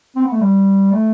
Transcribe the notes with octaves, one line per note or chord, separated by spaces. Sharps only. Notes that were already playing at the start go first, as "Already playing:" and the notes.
C4
B3
A3
G3
A3